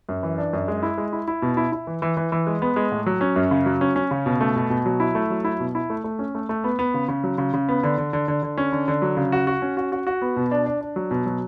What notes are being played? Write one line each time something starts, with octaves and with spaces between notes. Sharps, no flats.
F#2
E3
D4
F#2
G#3
E4
G#3
E4
E4
B2
E4
E4
E3
E3
E3
E3
G#3
B3
G#3
A2
F#3
C#4
F#2
C#3
F#3
C#4
C#4
C#3
B2
A3
B2
B2
F#3
E4
A3
F#3
E4
B2
E4
A3
A3
C#4
A3
A3
B3
B3
C#3
C#3
F#3
C#3
C#3
B3
D3
D3
D3
D3
D3
C#4
D3
D3
F#3
C#3
F#4
F#4
C#4
F#4
F#4
F#4
B3
B2
D4
D4
D4
F#3
B2
F#3